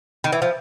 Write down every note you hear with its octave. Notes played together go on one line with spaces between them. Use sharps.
D#3
E3
F3